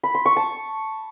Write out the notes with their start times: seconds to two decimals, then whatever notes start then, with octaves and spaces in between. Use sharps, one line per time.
0.03 B5
0.14 C6
0.25 C#6
0.36 A5